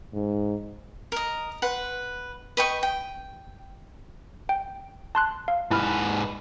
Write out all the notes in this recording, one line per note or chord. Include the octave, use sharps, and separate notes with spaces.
G#2
A#4 D#5
B4 F#5 C6
B4 D#5 G5 C#6
G5
G5
A5 C6 F#6
F5
G#2 E4 B4 F6